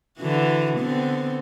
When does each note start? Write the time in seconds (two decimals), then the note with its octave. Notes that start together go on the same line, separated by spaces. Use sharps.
0.18 D3 E3 F#4
0.78 D3 B3 C4